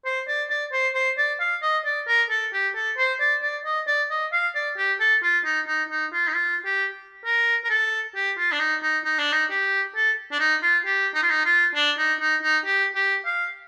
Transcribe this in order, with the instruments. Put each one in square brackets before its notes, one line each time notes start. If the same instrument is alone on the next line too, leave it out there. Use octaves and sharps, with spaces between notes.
[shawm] C5
D5
D5
C5
C5
D5
F5
D#5
D5
A#4
A4
G4
A4
C5
D5
D5
D#5
D5
D#5
F5
D5
G4
A4
F4
D#4
D#4
D#4
F4
D#4
F4
G4
A#4
A#4
A4
G4
F4
D4
D#4
D#4
D#4
D4
D#4
G4
A4
D4
D#4
F4
G4
D#4
F4
D#4
F4
D4
D#4
D#4
D#4
G4
G4
F5